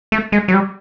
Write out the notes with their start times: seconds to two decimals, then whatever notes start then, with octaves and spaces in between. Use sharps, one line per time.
0.12 A3
0.32 G#3
0.48 F#3
0.54 G3